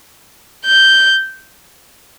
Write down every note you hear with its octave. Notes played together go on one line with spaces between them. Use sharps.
G6